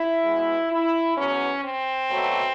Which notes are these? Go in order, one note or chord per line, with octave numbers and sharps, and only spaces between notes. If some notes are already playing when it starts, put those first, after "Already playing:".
Already playing: E4
B2 G#3 B3
E4
E2 B2 F#3 B3 C#4
C4
B2 F#3 A3